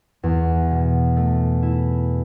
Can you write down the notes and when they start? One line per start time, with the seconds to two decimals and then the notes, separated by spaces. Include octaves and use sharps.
0.23 E2
0.71 B2
1.17 A3
1.63 E4